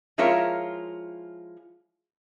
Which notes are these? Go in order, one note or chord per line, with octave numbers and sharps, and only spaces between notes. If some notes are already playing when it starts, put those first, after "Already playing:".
F3 G#3 E4 F4 A#4 C#5